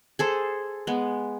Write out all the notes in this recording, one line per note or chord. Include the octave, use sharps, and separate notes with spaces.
G#4 A4 C5
G#3 B3